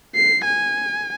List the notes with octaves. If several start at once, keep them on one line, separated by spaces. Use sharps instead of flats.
C7
G#5